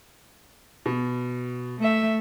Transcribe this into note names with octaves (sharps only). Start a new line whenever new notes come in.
B2
A3 E5